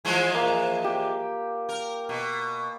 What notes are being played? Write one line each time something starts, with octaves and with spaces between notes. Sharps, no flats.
E3 F3 G#3
A#3
G4
A#4
B2